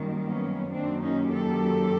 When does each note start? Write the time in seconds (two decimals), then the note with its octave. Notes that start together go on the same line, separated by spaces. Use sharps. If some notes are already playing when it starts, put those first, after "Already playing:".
Already playing: F#2 D#3 G3 A#3
0.27 B3 C#4
0.72 F#2 D#3 F#3 A#3 C4 D4
1.03 C#4 D#4
1.33 G4 A4